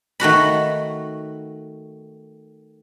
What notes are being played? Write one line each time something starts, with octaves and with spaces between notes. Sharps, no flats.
D#3 A3 F#4 B5